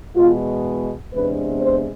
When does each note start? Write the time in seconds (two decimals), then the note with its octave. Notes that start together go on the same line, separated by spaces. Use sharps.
0.16 E2 B2 G#3 B3 F4
1.12 E2 C3 G#3 B3 D4 B4
1.61 C5